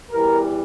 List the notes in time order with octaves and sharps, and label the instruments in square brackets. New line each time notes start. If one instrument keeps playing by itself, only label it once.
[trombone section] E2 E3 G3 A#4